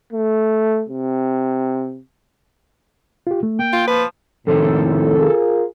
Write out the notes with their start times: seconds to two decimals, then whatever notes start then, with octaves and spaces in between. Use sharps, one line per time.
0.13 A3
0.89 C3
3.27 F4 G4
3.43 A3
3.59 A#3 G5
3.73 F4
3.87 F3 B4
4.47 F2 A2 C3 D#3 A4
5.18 F4 G#4 A#4